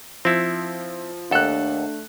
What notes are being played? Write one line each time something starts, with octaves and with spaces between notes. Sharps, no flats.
F3 C4 E4
D#2 A3 D4 A4 F#5 F#6